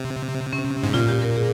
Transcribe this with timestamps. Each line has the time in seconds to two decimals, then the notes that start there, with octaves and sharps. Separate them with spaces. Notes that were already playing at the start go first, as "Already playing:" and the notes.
Already playing: C3
0.53 C#4
0.83 G#2
0.94 A#2 F4
1.08 G4
1.22 A#4
1.36 G#4